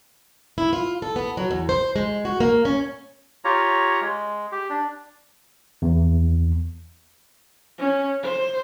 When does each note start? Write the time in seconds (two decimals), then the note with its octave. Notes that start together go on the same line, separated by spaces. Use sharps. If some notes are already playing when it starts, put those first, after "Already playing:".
0.58 E4
0.73 F4
1.02 A4
1.16 B3
1.37 F#3
1.51 E2
1.69 C5
1.96 G#3
2.25 F#4
2.40 A#3
2.65 C#4
3.45 F4 G4 C#5 A#5
4.01 G#3
4.52 G4
4.70 D4
5.82 E2
7.78 C#4
8.23 C5